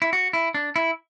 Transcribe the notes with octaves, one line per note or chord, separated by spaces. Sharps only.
E4
F#4
E4
D4
E4